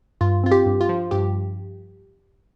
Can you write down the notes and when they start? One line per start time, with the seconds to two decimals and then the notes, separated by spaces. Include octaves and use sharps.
0.21 G2 F4
0.44 C4 F4
0.51 G4
0.66 G2
0.81 F4
0.89 F3
1.11 G2 G4